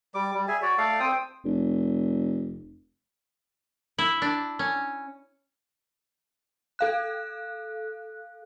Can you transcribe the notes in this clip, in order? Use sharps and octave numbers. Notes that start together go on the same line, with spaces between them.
G3 D6
G3
G#4 E5 G#5
F#4 C#5 D5
A3 A4 D5 F5
C4 C5 G5 D#6
F1
E4
D4
C#4
A4 F5 F#6